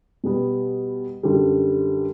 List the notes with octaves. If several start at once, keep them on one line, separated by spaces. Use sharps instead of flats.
B2 G3 B3
F#2 D3 G3